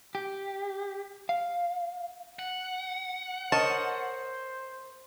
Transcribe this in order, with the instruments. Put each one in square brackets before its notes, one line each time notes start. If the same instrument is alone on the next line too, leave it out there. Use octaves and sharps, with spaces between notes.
[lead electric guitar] G4
F5
F#5
[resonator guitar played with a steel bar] A#4 C#5 D#5 [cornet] C5 [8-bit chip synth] A5